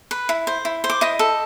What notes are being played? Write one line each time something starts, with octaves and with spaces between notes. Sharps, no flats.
B4
E4
C5
E4
C5
D6
E4 D#5 D#6
A4